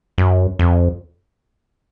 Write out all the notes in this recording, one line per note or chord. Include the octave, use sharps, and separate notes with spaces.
F#2
F2